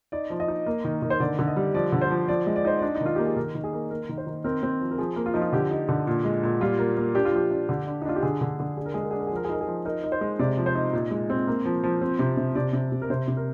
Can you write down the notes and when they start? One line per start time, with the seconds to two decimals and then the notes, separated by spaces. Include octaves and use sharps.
0.12 D#4 D5
0.30 F3
0.40 D#5
0.48 D#4
0.66 A#3
0.85 D#3
1.02 D#3
1.10 C5
1.20 D3 D5
1.39 D3
1.48 D#5
1.56 G3
1.74 F3 D5
1.92 D3
2.01 C5
2.10 F3
2.28 F3 D5
2.47 G#3
2.56 D5
2.65 D#4 C5
2.79 D4 D5
2.95 D#4
3.01 D#3 F4
3.15 A#3 G4
3.26 G#4
3.37 D#3 A#4
3.55 D#3
3.64 G#4
3.73 A#3
3.90 A#3 A#4
4.09 D#3
4.18 C5
4.27 D#3
4.44 C4 A#4
4.63 C4
4.81 F3
4.91 A#4
4.98 F3 G#4
5.16 A#3
5.26 F4
5.34 F3 D#4
5.41 F4
5.53 D3 G4
5.71 D#4
5.89 D3
6.07 A#2
6.25 G#3
6.43 A#2
6.61 G3 F4
6.79 A#3
6.97 A#3
7.15 D4 G4
7.25 F4
7.32 F3 G4
7.51 D4
7.69 D3
7.87 D4
8.02 D#4
8.05 D4 F4
8.16 G4
8.22 D3 G#4
8.41 D3
8.60 D3
8.77 D4 G#4
8.86 A#4
8.94 G#3 G#4
9.03 A#4
9.11 D4 G#4
9.20 A#4
9.27 G#4
9.31 F3 A#4
9.44 G#4
9.49 D#4 A#4
9.61 G#4
9.67 F3
9.85 D#4 A#4
10.04 D#4
10.12 C5
10.21 G#3
10.39 C3 D5
10.57 F3
10.66 C5
10.75 D#4
10.93 A#2
11.11 G#3
11.30 C4
11.47 A#3
11.66 F3
11.83 F3
12.02 C4
12.19 C3
12.37 C3
12.55 C3 D5
12.73 C3
12.92 C3
13.02 A#4
13.10 C3 C5
13.28 C3
13.37 A#4